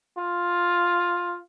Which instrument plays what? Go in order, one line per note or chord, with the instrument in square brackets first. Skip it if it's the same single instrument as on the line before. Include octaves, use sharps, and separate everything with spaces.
[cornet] F4